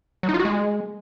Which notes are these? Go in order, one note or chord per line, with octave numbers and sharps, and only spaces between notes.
F#3
D#4
F4
F#4
G#3